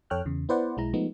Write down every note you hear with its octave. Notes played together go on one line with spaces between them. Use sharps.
F2 A4 C#5 G5 F6 F#6
E2 C#3
B3 E4 B4 C5 D5 F#5
B1 G#3 E4 A#5
F3 G#3 A3 B3 D#4